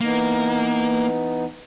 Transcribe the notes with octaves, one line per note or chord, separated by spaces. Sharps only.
E3 A#3 B3 D#4